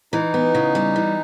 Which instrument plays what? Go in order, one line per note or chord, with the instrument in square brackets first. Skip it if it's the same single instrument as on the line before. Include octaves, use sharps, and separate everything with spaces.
[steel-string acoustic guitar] E3 [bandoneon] D#4
[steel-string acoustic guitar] B3
C#3
G3
E3